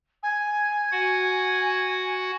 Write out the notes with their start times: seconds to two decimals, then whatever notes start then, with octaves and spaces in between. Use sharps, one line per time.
0.23 G#5
0.92 F#4 F#5